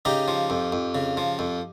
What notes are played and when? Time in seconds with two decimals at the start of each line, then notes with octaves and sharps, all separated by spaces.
0.05 C#3 D#4 G4
0.28 F3
0.50 F2
0.72 F2
0.95 C#3
1.17 F3
1.39 F2